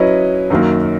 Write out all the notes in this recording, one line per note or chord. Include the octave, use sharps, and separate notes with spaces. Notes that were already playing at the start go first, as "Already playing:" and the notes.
Already playing: F#3 C#4 E4 B4 D#5
F#2 D#3 F#3 A#3